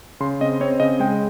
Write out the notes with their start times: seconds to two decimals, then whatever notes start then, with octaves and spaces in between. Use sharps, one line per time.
0.20 C#3 C6
0.41 C4 D#5
0.61 C4 C#5
0.80 C#3 D#5
1.00 G#3 G5